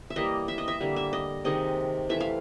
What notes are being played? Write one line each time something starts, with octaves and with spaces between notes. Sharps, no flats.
E5
E3 G3 A#3 D#5
E5
D#5
E5
D3 G3 A#3
E5
D#5
C3 D#3 G#3 D#5
E3 A3 E5
F5